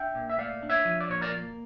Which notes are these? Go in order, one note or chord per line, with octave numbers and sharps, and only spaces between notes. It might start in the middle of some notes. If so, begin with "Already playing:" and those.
Already playing: D4 E5 G5
A#2
E5
A3 D5 F5
D4
C#5 E5
F3
D5
A#2 C#5
A#4 D5
A#3